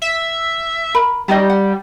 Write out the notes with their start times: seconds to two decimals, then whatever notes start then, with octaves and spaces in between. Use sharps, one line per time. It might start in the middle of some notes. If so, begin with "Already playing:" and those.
0.02 E5
0.95 A#4 B5
1.28 G3 C#4 D#4 D#5
1.50 F#5